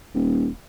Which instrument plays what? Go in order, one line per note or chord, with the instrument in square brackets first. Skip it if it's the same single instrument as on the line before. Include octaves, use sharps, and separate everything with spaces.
[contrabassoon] D#1